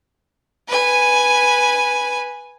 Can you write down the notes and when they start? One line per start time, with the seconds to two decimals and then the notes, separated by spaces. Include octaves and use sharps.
0.68 B4 G#5